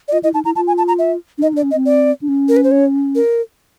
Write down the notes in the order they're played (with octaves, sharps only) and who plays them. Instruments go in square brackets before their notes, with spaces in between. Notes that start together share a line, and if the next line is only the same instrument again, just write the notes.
[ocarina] D5
[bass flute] F4 [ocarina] D#5
[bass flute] E4 [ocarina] D#5
[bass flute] D#4 [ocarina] A5
[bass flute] E4 [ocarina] A#5
[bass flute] F4 [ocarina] A5
[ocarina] G#5
A5
A#5
E5
[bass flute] D4
[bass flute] D#4 [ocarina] D#5
[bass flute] D4
[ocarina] D5
[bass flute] C#4
[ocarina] D#5
[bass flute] C4
[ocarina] D5
[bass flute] D4
C#4
[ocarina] A#4
B4
C5
C#5
A#4